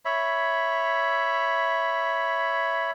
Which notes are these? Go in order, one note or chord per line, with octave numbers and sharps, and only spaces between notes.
C#5 E5 B5